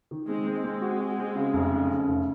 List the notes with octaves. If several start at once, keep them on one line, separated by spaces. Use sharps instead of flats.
D#3
G#3 C4
C4
G#3 C4
F#4
F#4
C4
C#3
F1
C#3
C#3
F1